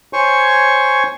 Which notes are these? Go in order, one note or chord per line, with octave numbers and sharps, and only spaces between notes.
C5 C#5 G#5 C#6